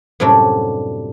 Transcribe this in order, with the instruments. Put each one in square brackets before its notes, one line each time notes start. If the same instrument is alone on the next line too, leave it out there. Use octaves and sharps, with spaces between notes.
[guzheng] F#2 A2 C3 F#3 G3 D4